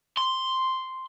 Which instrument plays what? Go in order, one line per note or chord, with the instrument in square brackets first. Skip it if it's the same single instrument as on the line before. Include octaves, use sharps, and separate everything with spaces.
[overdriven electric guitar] C6